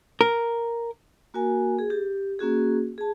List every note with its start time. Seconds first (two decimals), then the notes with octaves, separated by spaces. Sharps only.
0.21 A#4
1.34 A#3 F#4 A#4 G#5
1.79 G#4
1.90 G4
2.39 A#3 C#4 F#4 G#4
2.98 G#4 A5